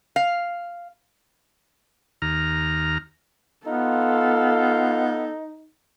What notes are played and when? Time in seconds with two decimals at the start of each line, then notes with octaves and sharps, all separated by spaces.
0.16 F5
2.22 D#2 A#5 F6
3.66 B3 D#4 F4 A4 F5